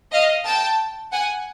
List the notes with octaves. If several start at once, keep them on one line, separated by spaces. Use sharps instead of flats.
D#5 F5
G5 A5
F#5 G#5